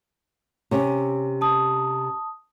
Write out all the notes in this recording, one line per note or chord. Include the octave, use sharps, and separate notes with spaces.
C3 C#4
A5 D#6